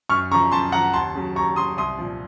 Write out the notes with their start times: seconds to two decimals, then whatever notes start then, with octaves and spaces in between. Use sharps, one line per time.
0.09 F#2 C#6 F6
0.32 C#3 F3 A#5 C#6
0.52 F#2 A5 C6
0.72 C#3 F3 F#5 A#5
0.93 D#2 A5 C6
1.15 C#3 F#3
1.35 D#2 A#5 C#6
1.56 C#3 F#3 C6 D#6
1.77 C2 C6 D#6
1.98 A#2 F3